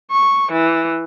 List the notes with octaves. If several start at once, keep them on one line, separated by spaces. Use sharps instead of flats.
C#6
E3